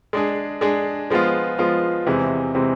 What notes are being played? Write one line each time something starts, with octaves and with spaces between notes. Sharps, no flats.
G#3 D4 G#4
G#3 D4 G#4
F3 G#3 B3 F4
F3 G#3 B3 F4
E2 C3 E3 G#3 C4
C3 E3 G#3 C4